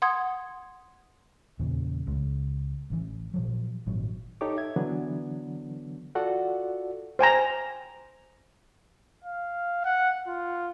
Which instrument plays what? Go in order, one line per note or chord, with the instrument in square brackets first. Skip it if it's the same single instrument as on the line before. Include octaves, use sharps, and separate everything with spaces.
[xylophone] F#5 C6 D#6 G#6
[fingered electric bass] E2 A#2 C#3
C#2
A1 E3
A#2 F3 F#3
G#1 A#2 F#3
[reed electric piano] D#4 G4 A4 C#5 D6
E5 G#6
D3 E3 F#3 B3 D4
F4 F#4 A4 D5 F#5
[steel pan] C5 G5 G#5 A#5
[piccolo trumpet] F5
F#5
F4